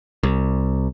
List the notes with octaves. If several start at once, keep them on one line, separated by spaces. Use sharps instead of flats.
C2